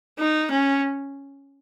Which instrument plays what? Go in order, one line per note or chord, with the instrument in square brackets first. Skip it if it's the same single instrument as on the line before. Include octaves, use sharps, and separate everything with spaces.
[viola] D#4
C#4